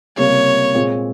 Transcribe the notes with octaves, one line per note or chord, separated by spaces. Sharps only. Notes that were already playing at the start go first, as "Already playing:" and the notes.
C#2 C3 G3 A#3 C#5
A#2 G#3 C4 F4 G#4